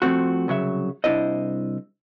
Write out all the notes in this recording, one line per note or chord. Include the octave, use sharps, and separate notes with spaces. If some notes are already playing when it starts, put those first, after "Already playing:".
F3 A3 C4 F#4
C2 C#3 F#3 E5
C2 D4 E4 C5 D#5